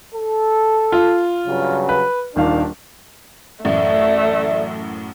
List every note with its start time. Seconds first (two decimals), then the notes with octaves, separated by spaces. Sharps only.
0.15 A4
0.92 F4
1.47 G2 C#3 F#3
1.89 B4
2.36 D#1 D#3 D4 F5
3.65 A1 F#2 A2 A3 D5 E5